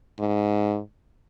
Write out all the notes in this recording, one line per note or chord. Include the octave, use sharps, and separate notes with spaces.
G#2